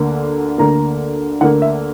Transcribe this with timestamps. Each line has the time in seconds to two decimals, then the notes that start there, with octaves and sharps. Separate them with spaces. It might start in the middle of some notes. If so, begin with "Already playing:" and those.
Already playing: D2 D3 A#3
0.58 D2 D3 A#3 A#5
1.41 D2 D3 A#3 F#5
1.62 E5